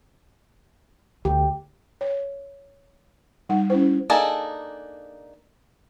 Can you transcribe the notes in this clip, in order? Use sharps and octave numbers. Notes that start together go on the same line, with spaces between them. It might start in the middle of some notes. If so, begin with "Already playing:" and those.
D2 G4
C#5
G3 D#4 F#5
C#4 E4 C5
A#3 D4 D#4 G#4 A4